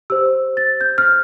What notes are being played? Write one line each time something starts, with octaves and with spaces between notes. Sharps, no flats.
G4 C5 E6
A6
G6
F6